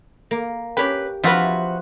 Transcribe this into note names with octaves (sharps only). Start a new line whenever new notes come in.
A#3
C#4 G4 A#4 B4
C3 F3 F4 F#4 B4 E5